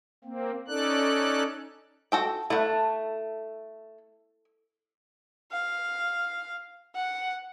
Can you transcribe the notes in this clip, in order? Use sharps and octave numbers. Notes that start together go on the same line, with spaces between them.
A#3 C4
C#4 D#4 A4 D5 F#6
F#4 A4 G5
A3 E4 F#5
F5
F#5